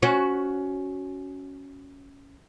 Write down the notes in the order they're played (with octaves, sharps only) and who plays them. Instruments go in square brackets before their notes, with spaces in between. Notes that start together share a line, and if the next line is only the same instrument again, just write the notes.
[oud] C#4 F#4